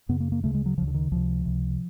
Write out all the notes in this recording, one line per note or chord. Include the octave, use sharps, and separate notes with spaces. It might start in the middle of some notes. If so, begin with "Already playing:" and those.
F#2 C#3 B3
A#3
A#3
D2 C#3 A3
G#3
F#3
D2 C#3 F3
D3
D#3
C#2 C3 F3
C#2 C3